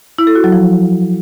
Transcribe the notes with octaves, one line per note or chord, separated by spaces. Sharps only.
E4
A4
F#4
F#3
F3